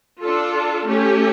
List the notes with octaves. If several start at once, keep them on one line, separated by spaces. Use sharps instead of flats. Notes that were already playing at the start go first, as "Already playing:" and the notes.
D4 F4 A4
A3 C#4 G4